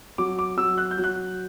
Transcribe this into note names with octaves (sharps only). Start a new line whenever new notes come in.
F#3 D6
D6
F#3 E6
F#6
G6
F#3
F#6